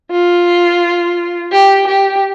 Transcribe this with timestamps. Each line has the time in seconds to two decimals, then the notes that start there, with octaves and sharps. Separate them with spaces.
0.11 F4
1.51 G4
1.87 G4